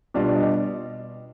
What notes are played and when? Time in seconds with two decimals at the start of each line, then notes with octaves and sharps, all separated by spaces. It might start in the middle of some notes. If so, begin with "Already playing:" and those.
0.14 B2 G3 D4 F4 D5
0.27 D5
0.36 D#5